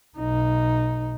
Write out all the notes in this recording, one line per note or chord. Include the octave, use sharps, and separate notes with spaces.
B1 D#4